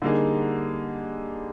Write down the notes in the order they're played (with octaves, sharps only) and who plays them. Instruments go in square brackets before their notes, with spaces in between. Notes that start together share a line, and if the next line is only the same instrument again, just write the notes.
[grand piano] D3 G3 A#3 D#4 G#4